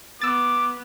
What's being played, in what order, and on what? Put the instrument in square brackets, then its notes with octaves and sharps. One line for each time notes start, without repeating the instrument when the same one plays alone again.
[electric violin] B3 [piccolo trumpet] D6 [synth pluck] E6 A6